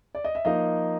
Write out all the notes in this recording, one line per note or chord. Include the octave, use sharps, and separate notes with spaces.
D5
D#5
E5
F3 A#3 D#4 D#5 F5